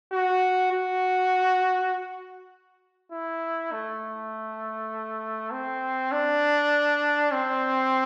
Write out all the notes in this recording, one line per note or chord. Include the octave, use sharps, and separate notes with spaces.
F#4
F#4
E4
A3
C4
D4
C4